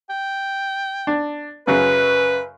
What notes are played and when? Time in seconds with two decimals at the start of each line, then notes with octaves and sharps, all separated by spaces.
0.09 G5
1.07 D4
1.67 F#2 C#3 F#3 B4